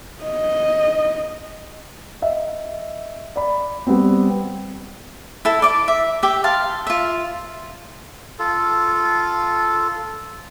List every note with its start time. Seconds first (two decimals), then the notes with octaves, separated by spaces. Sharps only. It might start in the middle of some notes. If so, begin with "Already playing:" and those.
0.24 D#5
2.22 D#5 E5
3.36 D5 B5
3.87 G3 B3 C4
5.45 E4 A4
5.62 D5 D6
5.88 E5
6.23 G4 E5
6.44 F5 A5 C6
6.87 F4 E5
8.39 F4 A4